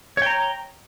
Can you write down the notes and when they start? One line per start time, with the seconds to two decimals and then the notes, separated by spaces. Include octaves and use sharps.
0.17 C#5
0.22 G5
0.26 A#5